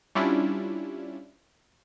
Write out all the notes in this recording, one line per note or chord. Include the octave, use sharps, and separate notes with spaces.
G3 C#4 D4 E4 F4